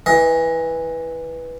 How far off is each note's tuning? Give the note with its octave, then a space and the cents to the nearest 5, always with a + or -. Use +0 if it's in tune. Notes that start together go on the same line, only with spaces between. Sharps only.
E3 -10 D#5 +25